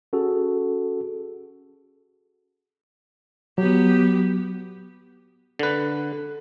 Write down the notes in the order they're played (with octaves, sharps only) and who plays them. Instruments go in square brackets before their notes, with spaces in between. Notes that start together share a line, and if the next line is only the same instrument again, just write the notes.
[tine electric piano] C#4 F#4 G#4 A4
[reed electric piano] F#3 [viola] B3 G4
[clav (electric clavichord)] D3 B4